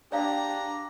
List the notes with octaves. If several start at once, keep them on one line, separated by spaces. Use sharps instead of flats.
D4 G4 D5 F5 A#5